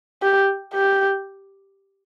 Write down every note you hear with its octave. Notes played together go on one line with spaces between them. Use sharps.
G4
G4